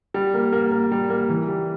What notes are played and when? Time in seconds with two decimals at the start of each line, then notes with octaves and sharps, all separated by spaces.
0.14 G3
0.34 A#3
0.52 A#3
0.72 A#3
0.92 G3
1.10 A#3
1.30 E3
1.48 G3